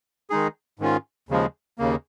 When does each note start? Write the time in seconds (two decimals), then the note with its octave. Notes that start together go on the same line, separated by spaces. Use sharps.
0.30 D#3 G#3 D#4 G#4
0.79 G#2 D#3 C#4 F4
1.29 D#2 C#3 F3 G#3
1.78 D#2 C#3 A#3